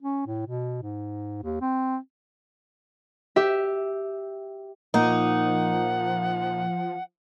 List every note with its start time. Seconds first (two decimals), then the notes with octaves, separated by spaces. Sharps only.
0.02 C#4
0.26 A2
0.46 B2
0.82 G#2
1.42 D#2
1.61 C4
3.36 G4 E5
4.94 A#2 F3 A#3 D#4 F#5